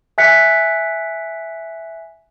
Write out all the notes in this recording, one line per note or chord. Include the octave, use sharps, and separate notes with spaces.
E5 G#5 F#6 B6 C#7